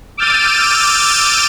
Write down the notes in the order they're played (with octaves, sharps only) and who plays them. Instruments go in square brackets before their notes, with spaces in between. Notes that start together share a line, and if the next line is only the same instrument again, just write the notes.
[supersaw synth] D6 E6 F6 G6 A6 D#7